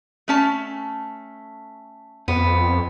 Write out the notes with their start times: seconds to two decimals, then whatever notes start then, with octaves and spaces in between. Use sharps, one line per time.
0.28 A3 C#4 A5
2.28 F2 B3